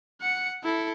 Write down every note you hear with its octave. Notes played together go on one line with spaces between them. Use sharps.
F#5 C#7
E4 A4